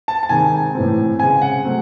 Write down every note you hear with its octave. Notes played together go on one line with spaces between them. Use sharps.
A5
A5
C3 D#3 G#3 C4 G#5
A2 E3 C4
C#3 G#3 C4 G#5
F#5
C3 F#3 A3 C4